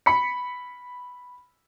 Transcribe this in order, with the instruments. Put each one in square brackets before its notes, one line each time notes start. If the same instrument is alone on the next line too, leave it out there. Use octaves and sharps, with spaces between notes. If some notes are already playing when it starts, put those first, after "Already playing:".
[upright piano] B5 B6 C#7